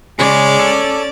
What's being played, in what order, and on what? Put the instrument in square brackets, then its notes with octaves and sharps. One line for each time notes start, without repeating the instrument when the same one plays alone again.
[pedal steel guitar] C#3 [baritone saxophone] G#3 [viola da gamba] C#4 D5
[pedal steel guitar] A4